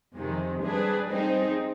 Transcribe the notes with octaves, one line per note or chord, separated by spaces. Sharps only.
F2 C3 D#3 G#3
G3 D4 G#4 B4
G3 C4 D#4 G#4